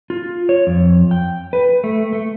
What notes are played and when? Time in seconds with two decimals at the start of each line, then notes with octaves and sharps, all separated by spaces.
0.10 F4
0.49 C#5
0.67 F2
1.11 G5
1.53 B4
1.84 A3
2.13 A3